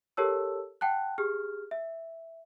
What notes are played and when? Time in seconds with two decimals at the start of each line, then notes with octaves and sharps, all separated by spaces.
0.17 G4 A4 A#4 C#5 A5 E6
0.81 F#5 G5 A5 F#6
1.18 G4 G#4 F6
1.71 E5